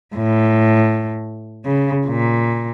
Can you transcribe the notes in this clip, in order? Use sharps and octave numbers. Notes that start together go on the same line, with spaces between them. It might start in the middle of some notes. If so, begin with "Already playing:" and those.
A2
C#3
A#2